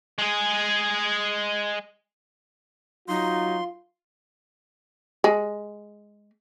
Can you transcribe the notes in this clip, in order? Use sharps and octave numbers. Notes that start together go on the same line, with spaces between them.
G#3 G#4
F#3 D#4 F4 C6
G#3